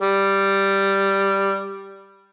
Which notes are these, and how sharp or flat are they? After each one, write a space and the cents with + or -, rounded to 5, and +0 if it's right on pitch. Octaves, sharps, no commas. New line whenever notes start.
G3 +0